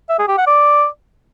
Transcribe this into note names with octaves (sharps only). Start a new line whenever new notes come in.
E5
G#4
G4
F#5
D5